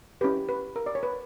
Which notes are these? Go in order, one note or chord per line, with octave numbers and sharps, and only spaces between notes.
C#4 E4 G4 B4
B4
A#4
D5
C#5
B4